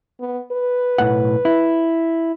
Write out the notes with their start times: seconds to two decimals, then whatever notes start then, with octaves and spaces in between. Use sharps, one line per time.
0.20 B3
0.52 B4
0.98 B1 A2 F#5
1.45 E4